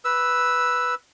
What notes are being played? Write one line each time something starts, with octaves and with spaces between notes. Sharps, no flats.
B4 E6